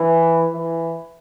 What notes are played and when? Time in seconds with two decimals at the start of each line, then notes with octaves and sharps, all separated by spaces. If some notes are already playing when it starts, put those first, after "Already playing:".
Already playing: E3
0.53 E3